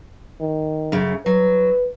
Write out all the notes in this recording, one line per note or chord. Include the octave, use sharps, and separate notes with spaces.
D#3
F#2 C#3
F#3 B4